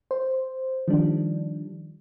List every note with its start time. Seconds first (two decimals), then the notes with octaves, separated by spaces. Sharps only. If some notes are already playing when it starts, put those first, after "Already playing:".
0.11 C5
0.88 D#3 F3 G3 D4